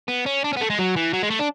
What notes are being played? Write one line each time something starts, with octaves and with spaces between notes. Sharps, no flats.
B3
C#4
D4
C#4
B3
A3
G#3
F#3
E3
F#3
G#3
A3
D4